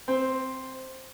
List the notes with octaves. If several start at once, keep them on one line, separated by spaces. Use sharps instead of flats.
C4